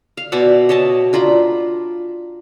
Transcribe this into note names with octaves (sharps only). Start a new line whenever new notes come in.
F5
B2 D5 E5 F#5
C#5 D#5 E5 A5
D4 F4 A#5 B5